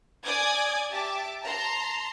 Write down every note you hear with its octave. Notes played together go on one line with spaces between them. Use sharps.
D5 G#5 D6 D#6 G#6
G4 E5 A5 D6
A5 A#5 C6